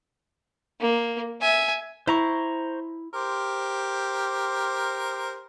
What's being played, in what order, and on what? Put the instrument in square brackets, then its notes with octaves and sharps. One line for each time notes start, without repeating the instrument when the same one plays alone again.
[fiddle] A#3
E5 G#5
[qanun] E4 [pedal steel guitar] C5 A#5 C#6
[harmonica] G4 A#4 C5